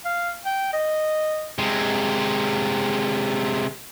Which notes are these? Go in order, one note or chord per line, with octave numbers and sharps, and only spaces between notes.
F5
G5
D#5
C3 G#3